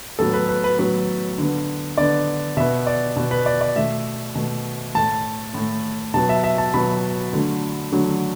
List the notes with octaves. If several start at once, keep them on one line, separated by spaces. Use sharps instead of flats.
A2 F#3 B3 A4
B4
B4
B4
A2 F#3 B3 B4
D3 B3
D3 B3 D5
B2 B3 E5
D5
B2 B3
B4
D5
D5
B2 A3 E5
B2 A3
A2 A3 A5
A2 A3
B2 F#3 B3 A5
E5
E5
A5
B2 F#3 B3 B5
D3 F#3 A3
D3 F#3 A3